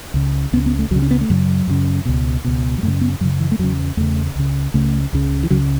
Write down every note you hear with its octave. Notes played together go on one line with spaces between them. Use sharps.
C#2 C#3
C#2 C#3 B3
B3
A3
C#2 C#3 F#3
C#4
B3
A3
F#2 C#3 F#3
F#2 C#3
C#2 B2
C#2 B2
F#3
F#2 C#3 A3
B3
F#2 C#3 F#3
E3
A3
E2 C#3 F#3
E2 C#3 A3
C#2 C#3
C#2 C#3 A3
C#2 C#3
E3
C#2 C#3 F#3